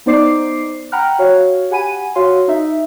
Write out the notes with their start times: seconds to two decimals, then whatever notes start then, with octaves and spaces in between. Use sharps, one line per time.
0.06 B3 D#4 C5 D5 D6 C7
0.92 F#5 G5 A#5 B5 F6 F#6
1.19 F#4 C#5 F5
1.70 G4 F#5 G#5 B5 D#7
2.15 F#4 C#5 F5 C6
2.48 D#4 E5